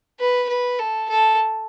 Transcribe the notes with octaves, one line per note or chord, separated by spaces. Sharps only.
B4
B4
A4
A4